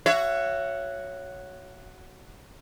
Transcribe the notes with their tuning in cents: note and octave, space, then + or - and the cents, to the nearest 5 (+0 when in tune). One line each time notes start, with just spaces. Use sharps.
F#4 +0 C#5 +0 E5 +35